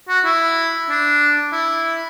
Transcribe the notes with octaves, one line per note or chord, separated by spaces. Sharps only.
F#4
E4
D4
E4